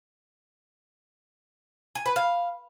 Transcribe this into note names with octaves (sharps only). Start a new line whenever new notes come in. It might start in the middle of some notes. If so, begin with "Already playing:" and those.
G#5
B4
F5